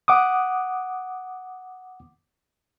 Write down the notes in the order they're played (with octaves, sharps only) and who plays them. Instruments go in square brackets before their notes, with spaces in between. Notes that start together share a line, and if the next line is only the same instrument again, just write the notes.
[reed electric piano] F#5 D6 D#6